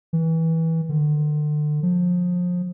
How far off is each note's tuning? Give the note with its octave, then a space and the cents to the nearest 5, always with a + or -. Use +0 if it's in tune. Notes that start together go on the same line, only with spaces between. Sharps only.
E3 -20
D3 +35
F3 +30